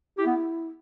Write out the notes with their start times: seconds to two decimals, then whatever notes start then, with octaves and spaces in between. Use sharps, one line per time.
0.18 E4 G4
0.26 B3